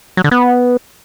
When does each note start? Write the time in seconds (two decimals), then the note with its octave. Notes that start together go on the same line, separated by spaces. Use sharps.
0.17 F#3
0.24 D3
0.31 B3